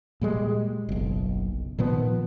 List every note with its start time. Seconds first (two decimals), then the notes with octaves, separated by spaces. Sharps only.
0.21 A#2 G3 G#3
0.89 F#1 B1
1.78 A#2 D#3 F3 B3